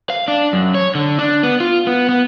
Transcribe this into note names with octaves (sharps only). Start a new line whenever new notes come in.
F5
D4
F#2
C#5
D3
D4
B3
F4
B3
B3